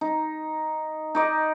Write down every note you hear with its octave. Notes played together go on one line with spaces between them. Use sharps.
D#4
D#4 D5 D#5